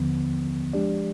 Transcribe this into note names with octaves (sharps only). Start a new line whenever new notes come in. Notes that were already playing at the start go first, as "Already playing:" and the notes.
Already playing: D#2 D3 F3 B3
F3 G#3 D4 G4 D5